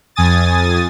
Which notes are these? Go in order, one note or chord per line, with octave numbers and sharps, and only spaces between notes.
F2 G#5 D#6 A6